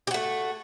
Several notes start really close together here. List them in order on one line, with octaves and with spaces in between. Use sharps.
G4 F#4 A3